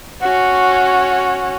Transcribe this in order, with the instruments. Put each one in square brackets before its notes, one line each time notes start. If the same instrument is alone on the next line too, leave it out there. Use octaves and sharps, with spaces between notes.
[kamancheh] C#4 F#4